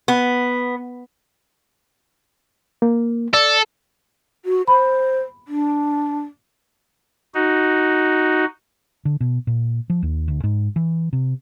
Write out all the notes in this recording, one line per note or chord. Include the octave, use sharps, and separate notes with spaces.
B3
A#3
A4 D5
F#4
C5 B5
D4
D#4 F#4
D3
B2
A#2
F3
D#2
D2
G#2
E3
C3